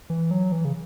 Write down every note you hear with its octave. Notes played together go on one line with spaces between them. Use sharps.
E3
F#3
E3
C#3